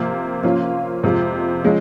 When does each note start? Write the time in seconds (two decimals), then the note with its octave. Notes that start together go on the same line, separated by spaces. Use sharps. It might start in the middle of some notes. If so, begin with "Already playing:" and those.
Already playing: C3 F3 A#3
0.43 F3 A#3 C#4 F4
1.03 F2 C3 F3 G#3
1.64 F3 G#3 C#4